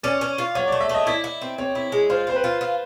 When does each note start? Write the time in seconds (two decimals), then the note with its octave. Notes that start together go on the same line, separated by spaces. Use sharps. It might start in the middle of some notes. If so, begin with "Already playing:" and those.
0.03 C#4 D5
0.21 C#4
0.38 F4
0.55 F#3 C#5
0.68 D5
0.72 A3
0.80 E5
0.89 A3 D#5
1.07 E4 D5
1.24 E4
1.41 C4
1.58 C4 C#5
1.75 E4
1.92 G#3
2.10 F4 C5
2.27 C4 C5
2.36 B4
2.44 F4
2.61 F4